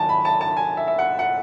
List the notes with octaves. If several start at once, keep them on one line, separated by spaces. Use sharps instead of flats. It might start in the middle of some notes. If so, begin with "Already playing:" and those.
Already playing: D#2 D#3 F#3 G#5 A5
B5
A5
A5
G#5
E5
E5
F#5
F#5